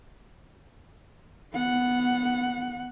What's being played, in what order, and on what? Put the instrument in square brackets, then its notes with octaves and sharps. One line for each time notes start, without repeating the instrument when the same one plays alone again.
[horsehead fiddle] B3 F#5